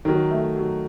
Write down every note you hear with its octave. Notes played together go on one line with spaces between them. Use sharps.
D#3 F#3
A3
F#3